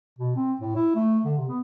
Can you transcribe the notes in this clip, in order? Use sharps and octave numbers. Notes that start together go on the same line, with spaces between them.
B2
C4
A2
E4
A3
D3
C3
B3